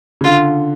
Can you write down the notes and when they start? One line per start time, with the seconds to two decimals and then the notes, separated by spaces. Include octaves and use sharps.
0.21 C#3
0.24 D3 F4